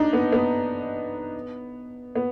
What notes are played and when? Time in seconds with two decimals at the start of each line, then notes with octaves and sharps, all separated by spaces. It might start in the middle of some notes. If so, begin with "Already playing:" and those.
Already playing: D4 D#4
0.13 B3
0.32 B3
2.16 B3